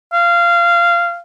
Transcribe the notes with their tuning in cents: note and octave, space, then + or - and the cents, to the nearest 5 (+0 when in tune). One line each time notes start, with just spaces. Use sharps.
F5 -20